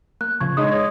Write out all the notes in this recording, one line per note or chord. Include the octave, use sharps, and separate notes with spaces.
A#3 F#6
A#2 C#3 F3 C#6 G#6
G#3 D#4 C#5 D#6